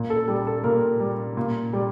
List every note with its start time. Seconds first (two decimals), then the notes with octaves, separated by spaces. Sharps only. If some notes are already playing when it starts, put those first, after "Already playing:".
Already playing: A#2
0.10 A4
0.28 G3 A4
0.47 A4
0.64 A#2 A#4
1.00 G3
1.37 A#2
1.73 G3